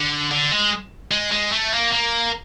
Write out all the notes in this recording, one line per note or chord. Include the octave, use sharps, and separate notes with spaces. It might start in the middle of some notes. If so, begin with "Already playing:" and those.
Already playing: D3
D3
G#3
G#3
G#3
A3
A#3
A#3